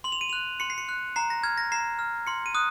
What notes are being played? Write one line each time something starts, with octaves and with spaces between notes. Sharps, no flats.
C6 F#7
F7
D#7
F#6 F7
C6 C#7
C7
C#7
F#6
A#5 C7
A#6
F6 G#6
A#6
A#5 C7
F6
C6 C#7
D#7
D#6 F#6